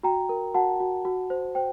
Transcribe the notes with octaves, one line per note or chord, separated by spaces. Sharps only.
F#4 G5 A#5
A#4
F#4 F#5 A5
F#4
F#4
C5
C5 G5